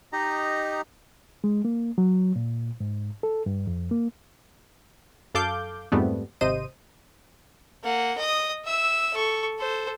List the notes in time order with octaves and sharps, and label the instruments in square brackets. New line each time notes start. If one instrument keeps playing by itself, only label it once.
[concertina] D#4 G4 D#5 A#5
[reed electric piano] G#3
A#3
F#3
A#2
G#2
A4
G2
F2
A#3
[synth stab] F#2 A4 F5 D6 G6
F2 G#2 G3 A3 B3 C4
G#1 C3 C5 D#5 D#7
[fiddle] A#3 F#5
D#5 D#6
E5 E6
A4 C#6
A4 C5